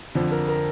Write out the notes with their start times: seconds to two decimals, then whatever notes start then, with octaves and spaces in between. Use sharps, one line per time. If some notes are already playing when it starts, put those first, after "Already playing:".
0.15 F2 D3 F3
0.32 A#4
0.48 A#4